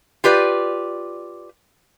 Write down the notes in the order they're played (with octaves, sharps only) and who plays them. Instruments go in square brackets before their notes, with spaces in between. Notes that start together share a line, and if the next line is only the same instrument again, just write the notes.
[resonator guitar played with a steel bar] F4 G4 B4 D5